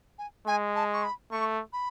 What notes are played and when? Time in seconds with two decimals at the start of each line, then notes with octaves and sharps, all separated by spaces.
0.19 G#5
0.47 G#3 G#5
0.76 A5
0.93 C#6
1.04 B5
1.31 A3 C#6
1.73 B5